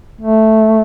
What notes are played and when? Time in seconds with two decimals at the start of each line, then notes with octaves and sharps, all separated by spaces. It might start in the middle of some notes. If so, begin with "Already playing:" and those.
0.21 A3